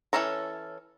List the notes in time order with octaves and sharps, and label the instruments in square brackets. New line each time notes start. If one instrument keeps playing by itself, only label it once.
[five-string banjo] E3 C#4 A4 C#5 A#5